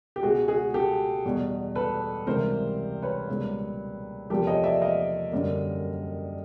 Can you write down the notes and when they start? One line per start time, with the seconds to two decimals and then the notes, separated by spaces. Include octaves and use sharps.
0.16 G4
0.22 C#2 B2 G#3 F#4 G#4
0.48 F#4 G#4
0.74 G4 A4
1.25 E2 B2 G3
1.75 A4 B4
2.27 C#2 C3 E3 G3 A#4 C5
3.02 B4 C#5
3.28 C#2 B2 G3 A#3
4.30 E2 C3 F3 A#3 G4 A4
4.47 C#5 D#5
4.64 D5 E5
4.81 D#5 F5
5.31 F#2 D3 G3 A#3